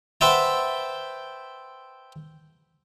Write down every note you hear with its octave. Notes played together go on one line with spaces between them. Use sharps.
B4 C5 E5 F#5 G5 A5